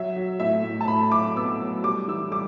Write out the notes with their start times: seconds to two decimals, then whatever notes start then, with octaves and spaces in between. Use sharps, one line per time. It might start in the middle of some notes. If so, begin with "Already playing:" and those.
Already playing: F#3 E5
0.16 F#3
0.40 A2 E5
0.64 A2
0.81 A5
0.88 A2 B5
1.12 F#3 D6
1.36 B3 E6
1.60 F#3
1.84 G3 D6
2.08 E3 E6
2.32 G3 D6